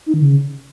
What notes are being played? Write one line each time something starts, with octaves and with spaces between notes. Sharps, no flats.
D#4
D#3
C#3